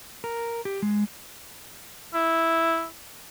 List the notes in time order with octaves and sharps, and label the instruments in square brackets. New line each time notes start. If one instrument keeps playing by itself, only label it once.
[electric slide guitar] A#4
G4
G#3
[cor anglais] E4